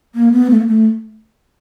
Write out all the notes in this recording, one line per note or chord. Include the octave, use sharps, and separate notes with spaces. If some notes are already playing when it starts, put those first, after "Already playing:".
A#3
B3
A3
A#3
A3